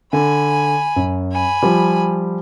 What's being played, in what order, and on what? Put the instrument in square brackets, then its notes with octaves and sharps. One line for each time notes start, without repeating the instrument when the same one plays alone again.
[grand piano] D3 [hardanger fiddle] G#5 B5
[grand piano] F#2
[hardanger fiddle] G#5 B5
[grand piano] F3 G3